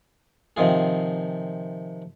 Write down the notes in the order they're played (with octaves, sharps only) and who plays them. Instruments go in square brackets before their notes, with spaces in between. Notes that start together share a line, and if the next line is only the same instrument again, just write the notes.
[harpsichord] C3 D#3 F3 F4 G#4